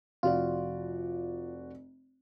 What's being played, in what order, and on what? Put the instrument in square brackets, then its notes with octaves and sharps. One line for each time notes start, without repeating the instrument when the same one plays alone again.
[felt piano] F1 F#4 D5 [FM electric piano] F4